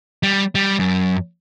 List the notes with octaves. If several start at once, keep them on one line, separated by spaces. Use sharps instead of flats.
G3
G3
F#2